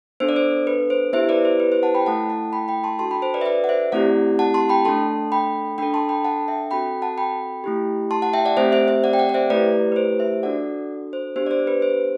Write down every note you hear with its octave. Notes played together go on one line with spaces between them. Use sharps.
B3 D4 A4 C5
D5
C5
B4
C5
B3 E4 G4 C5 E5
B4 D5
C5
B4
C5
F#5 A5
G5 B5
A3 E4 A4 F#5 A5
F#5 A5
G5 B5
G5 B5
A5 C6
D4 F#4 A4 A5 C6
G5 B5
C5
B4 D5
E5
B4 D5
F#5
C5 E5
A3 C4 E4 G4 D5 F#5
F#5 A5
A5 C6
G5 B5
A3 D4 A4 A5 C6
G5 B5
D4 A4 G5 B5
A5 C6
G5 B5
F#5 A5
E5 G5
C4 F#4 A4 G5 B5
F#5 A5
G5 B5
A3 E4 G4
A5 C6
F#5 A5
E5 G5
D5 F#5
A3 C4 G4 C5 E5
C5 E5
C5 E5
D5 F#5
G5
D5 F#5
D5
C5 E5
A3 E4 G4 B4 D5
B4
C5
C5 E5
D4 F#4 A4 D5 F#5
C5
B3 D4 G4 C5
D5
C5
B4
C5